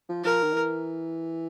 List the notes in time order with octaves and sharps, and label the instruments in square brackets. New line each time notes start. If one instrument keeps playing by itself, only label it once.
[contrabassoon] F3
[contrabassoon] F3 [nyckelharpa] A#4
[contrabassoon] D#3
E3